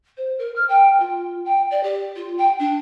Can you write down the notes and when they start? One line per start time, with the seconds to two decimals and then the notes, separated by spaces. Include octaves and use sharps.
0.17 C5
0.38 A#4
0.56 F6
0.69 G5
1.00 F4
1.45 G5
1.71 D5
1.83 G4
2.16 F4
2.38 G5
2.59 D4